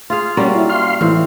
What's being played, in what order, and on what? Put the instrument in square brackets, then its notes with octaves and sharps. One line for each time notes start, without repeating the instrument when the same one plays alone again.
[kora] F4 G#4 F5
[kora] G3 A#3 F#4 [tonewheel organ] C#4
[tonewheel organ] E4
F5 C6
[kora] A2 C4 [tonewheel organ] E3